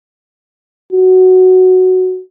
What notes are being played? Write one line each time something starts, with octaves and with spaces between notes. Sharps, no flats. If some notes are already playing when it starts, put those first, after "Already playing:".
F#4